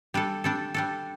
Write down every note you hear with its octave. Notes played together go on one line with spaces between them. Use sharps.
G3 D4 A4
G3 D4 A4
G3 D4 A4